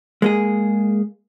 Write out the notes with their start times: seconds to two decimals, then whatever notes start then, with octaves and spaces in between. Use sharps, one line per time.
0.22 G#3 A#3 G#4